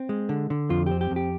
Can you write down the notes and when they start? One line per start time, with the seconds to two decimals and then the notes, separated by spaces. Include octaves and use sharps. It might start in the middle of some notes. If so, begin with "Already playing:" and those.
Already playing: C4
0.09 G#3
0.29 D3
0.50 D3
0.70 F2 F4
0.86 C4 G4
1.01 G4
1.11 F2
1.16 G4